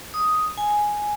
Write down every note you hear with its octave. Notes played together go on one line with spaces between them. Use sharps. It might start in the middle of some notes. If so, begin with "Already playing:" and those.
D#6
G#5